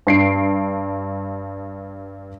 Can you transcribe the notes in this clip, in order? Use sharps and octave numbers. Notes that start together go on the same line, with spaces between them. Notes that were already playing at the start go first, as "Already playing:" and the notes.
G2 C7 D7